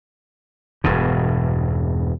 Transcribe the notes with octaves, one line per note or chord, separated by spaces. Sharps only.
E1 G2 B2